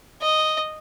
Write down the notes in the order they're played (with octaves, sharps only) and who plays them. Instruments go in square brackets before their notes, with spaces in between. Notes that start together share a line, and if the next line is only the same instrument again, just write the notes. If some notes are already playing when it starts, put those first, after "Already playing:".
[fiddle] D#5